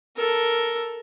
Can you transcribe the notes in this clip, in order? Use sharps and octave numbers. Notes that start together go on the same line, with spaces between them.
A4 A#4